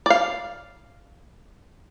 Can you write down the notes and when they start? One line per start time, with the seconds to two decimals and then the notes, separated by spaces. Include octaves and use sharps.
0.06 D5 F5